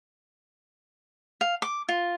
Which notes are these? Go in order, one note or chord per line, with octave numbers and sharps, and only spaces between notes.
F5
D6
F4